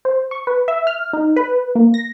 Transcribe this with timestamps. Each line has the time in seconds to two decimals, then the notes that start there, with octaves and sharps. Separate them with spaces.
0.05 C5
0.31 C#6
0.47 B4
0.68 E5
0.87 F6
1.13 D#4
1.36 B4
1.75 A#3
1.94 A#6